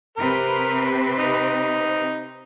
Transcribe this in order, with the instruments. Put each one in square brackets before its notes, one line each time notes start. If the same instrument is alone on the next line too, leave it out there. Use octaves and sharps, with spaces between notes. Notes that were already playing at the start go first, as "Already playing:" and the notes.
[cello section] C3 C4 B4 [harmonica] A#4
[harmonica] D#4